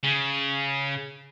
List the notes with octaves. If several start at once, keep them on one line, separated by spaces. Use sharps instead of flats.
C#3